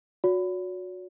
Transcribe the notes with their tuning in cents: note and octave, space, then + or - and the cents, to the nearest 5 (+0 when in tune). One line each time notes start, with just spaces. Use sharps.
F#4 -25 C#5 +45